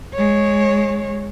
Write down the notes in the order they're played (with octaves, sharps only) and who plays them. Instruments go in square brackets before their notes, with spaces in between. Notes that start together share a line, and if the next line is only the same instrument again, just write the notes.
[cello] G#3 C#5